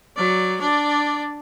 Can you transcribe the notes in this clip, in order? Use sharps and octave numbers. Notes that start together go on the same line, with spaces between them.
F#3 D5
D4 D5